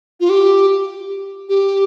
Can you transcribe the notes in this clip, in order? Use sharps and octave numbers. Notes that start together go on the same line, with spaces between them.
F4
G4
G4